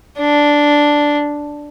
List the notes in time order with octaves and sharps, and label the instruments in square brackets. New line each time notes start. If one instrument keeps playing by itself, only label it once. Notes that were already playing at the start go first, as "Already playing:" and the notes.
[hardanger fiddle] D4